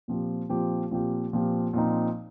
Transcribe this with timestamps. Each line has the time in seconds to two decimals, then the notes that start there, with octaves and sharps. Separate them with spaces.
0.08 A#2 F3 C4 G4
0.49 A#2 F3 C4 G4
0.91 A#2 F3 C4 G4
1.33 A#2 F3 C4 G4
1.73 A#2 F3 C4 D#4